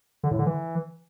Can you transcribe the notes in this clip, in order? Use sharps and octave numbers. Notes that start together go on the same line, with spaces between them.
D3
A2
D3
E3